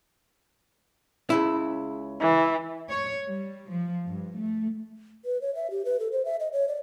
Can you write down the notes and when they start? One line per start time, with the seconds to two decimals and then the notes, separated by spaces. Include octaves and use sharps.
1.30 C#2 C#3 E4
2.21 E3
2.90 C#5
3.26 G3
3.69 F3
4.06 G2
4.37 A3
5.25 B4
5.41 C#5
5.55 E5
5.71 G4
5.85 B4
6.00 A4
6.12 C5
6.25 E5
6.40 D#5
6.53 C#5
6.68 D5